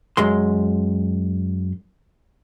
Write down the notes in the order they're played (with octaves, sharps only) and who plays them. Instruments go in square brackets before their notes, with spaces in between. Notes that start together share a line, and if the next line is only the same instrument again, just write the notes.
[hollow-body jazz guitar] F#2 G#3 C6